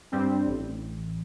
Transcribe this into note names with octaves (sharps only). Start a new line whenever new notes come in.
G2 G3 C4
A1